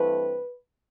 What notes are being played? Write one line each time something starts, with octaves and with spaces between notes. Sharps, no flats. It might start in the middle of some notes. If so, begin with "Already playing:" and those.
Already playing: G2 E3 A3 C4 B4